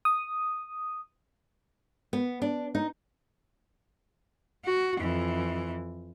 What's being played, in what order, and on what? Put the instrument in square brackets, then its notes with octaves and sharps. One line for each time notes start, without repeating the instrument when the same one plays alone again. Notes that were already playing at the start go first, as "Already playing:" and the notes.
[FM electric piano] D#6
[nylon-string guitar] B3
D4
D#4
[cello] F#4
F2 E3